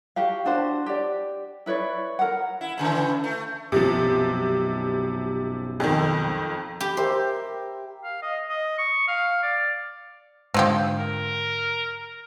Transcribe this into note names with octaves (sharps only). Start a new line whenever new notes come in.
F#4 G4 F5
D4 F#4 C5
G4 D5
E4 B4 C#5 D5
A#4 F#5
E4
A2 C#3 E3
A3
B1 F#2 C3 F3
F2 D#3
G4 B5
G4 A#4 C5 E5
F5
D#5
D#5
C#6
F5
D5
G#2 D3 C4 F4 G4
A#4